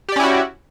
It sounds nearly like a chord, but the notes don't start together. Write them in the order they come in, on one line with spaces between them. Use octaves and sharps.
G4 D5 C#4 E4 F#4